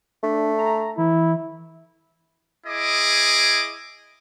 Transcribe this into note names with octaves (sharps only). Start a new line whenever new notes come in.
A3 D4
A#5
E3 E4
E4 G#4 D#5 D6